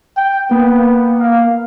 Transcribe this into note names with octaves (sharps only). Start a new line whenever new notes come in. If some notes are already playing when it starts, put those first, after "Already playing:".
G5
A#3 B3
F5